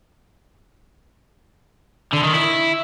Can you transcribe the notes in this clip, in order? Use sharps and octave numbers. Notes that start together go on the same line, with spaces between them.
D3
D#3
E4